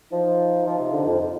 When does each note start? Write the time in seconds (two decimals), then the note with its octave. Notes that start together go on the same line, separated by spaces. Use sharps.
0.12 F3 D#4
0.66 F3
0.79 C3
0.92 D3
1.05 F2